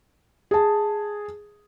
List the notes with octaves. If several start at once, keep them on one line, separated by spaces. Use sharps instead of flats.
G#4 A5